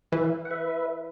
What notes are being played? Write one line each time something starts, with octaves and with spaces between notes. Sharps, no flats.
E3 B4 E5
F#5
B4 E5